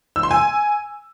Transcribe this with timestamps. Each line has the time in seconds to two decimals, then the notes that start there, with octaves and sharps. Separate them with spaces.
0.16 E6
0.23 C6
0.31 G#5